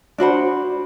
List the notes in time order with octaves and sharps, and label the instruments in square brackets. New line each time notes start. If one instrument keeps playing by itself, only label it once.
[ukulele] D4 F#4 C5 B5